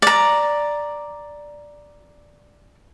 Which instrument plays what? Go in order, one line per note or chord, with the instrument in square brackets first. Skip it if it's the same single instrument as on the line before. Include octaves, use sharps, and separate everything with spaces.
[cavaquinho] D5 A#5